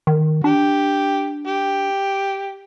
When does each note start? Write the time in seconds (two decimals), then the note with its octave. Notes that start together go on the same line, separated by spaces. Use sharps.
0.07 D#3
0.44 D4 G4
1.47 G4